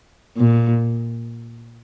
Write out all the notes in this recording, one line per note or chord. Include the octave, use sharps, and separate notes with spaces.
A#2